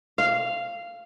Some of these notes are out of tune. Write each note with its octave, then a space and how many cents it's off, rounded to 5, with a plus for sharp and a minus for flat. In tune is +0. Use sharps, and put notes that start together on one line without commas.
F5 -10